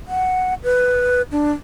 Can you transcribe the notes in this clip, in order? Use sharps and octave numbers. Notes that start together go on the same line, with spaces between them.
F#5
B4
D4